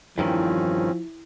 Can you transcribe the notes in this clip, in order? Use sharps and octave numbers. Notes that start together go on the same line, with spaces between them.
E2 G2 D#3 F3 C4 C#4 E4